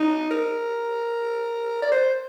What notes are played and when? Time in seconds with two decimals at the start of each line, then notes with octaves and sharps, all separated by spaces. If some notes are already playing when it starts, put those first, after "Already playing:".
Already playing: D#4
0.31 A#4
1.82 D5
1.92 C5